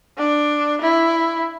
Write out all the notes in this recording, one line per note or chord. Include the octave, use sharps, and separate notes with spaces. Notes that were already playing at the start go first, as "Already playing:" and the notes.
D4
E4